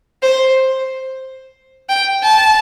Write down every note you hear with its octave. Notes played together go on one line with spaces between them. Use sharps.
C5
G5
A5